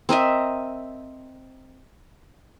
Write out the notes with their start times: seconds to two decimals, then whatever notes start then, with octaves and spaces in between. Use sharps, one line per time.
0.09 C4 A#4 D#5 E5